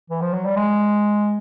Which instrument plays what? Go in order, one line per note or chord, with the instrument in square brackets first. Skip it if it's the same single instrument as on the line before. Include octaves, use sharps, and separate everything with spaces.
[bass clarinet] E3
F3
F#3
G3
G#3